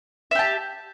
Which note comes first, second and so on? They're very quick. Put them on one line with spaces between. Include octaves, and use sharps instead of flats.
E5 G4 A5